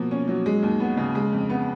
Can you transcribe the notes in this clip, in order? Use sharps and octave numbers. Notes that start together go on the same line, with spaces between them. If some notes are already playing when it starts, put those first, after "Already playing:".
Already playing: B2 F3 A#3
C#4
F#3
G#3
D#2
B3
C#3
G#3
F2
B3